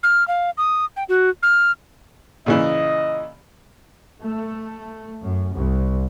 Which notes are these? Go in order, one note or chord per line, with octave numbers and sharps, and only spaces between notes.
F6
F5
D#6
G5
F#4
F6
A#2 C#3 E3 D#5
A3
F#2
C2